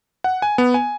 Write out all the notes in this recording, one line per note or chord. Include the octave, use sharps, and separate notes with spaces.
F#5
G#5
B3
G#5